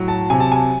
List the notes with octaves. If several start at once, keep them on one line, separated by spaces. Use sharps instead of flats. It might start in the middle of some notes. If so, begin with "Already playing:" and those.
Already playing: A2 F#3
A5
C3 G#5
A5
G#5